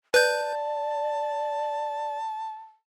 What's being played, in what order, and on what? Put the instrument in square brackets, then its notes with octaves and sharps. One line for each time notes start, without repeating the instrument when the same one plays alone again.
[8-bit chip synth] B4 G6 [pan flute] D5 [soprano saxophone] A5